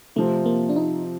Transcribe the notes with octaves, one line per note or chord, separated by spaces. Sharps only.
C3 F3 A3 C4
A#3
D4
D#4